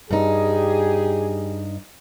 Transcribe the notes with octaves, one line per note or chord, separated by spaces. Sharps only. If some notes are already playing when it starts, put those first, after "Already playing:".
G2 D#4 G4 G#4